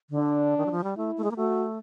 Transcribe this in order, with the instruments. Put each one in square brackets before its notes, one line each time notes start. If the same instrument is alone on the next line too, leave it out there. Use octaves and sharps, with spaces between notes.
[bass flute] D3
[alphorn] D4
[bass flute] D#3
F#3
F3
G3
[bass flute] A3 [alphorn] E4
[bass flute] A3
G#3
A#3
[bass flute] A3 [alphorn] F#4